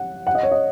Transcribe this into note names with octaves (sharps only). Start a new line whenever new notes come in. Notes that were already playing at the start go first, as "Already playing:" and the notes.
Already playing: F#5
F#5
D#5
C#5
D#5